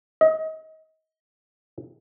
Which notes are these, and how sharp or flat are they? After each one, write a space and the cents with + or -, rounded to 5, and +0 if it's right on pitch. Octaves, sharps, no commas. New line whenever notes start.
D#5 +30